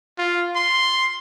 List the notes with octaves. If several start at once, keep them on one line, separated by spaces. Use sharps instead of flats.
F4
C6